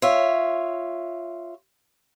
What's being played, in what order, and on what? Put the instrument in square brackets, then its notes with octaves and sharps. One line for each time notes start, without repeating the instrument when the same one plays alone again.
[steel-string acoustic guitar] F4 C#5 E5